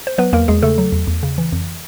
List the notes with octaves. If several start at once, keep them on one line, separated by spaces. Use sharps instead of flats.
C5
F#3 B3 B4
E2 A#3 A#4
E2 G#3 G#4
C#3 A3 A4
F#3
E2
E2
C#3
E3
F2